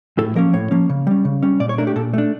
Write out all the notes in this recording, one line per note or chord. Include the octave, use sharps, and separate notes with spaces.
A2 A4
F3 A#3 C#4 A#4
A2 C#5
F3 A#3 C#4
C#3
G3 C#4
C#3
G3 C#4
A#2 D5
C#5
A3 D4 A#4
G4
A#2 A4
A3 D4